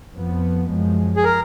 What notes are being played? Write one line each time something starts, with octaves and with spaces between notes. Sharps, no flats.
F2 F3 B3
F#2 F3 G#3
G#4
A#4